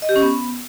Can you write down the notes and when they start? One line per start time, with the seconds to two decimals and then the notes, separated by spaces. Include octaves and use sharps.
0.02 D#5
0.09 G4
0.16 C#4
0.22 B3